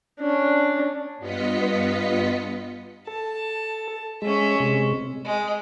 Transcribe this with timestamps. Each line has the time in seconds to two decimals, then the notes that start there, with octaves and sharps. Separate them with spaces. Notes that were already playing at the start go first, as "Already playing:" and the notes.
0.20 C#4 D4
1.18 G2 B3 F4 D#5 B6 C#7
3.07 A4 A5
4.22 G#3 C#4 E5
4.60 C3 G#3
5.25 G#3